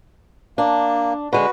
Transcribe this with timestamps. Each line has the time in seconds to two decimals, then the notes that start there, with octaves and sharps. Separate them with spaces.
0.58 A#3 D4
1.33 D3 G#3 F#4 B4